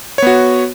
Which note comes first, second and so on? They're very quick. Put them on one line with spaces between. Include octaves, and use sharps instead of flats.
C#5 B3 F#4